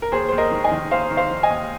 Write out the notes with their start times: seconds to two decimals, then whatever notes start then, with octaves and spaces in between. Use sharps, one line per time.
0.02 A#4
0.12 D#2 G#4 C5
0.29 D#2 C5
0.38 A#4 D#5
0.51 D#3
0.64 D#5 G#5
0.71 D#3
0.91 D#2 C5 F5
1.11 D#3
1.17 C5 F5
1.31 D#3
1.43 D#5 G#5
1.50 D#2